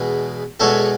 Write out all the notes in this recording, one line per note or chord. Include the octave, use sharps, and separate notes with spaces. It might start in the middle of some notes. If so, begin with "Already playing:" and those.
Already playing: E2 B2 G#3 B3
E2 B2 G#3 B3 A4 C#5